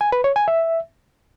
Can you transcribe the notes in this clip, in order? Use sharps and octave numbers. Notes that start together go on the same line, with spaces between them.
G#5
B4
C#5
G#5
E5